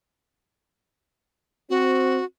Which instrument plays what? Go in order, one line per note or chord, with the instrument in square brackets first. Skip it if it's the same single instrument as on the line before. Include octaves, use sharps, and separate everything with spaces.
[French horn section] C4 [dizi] F#4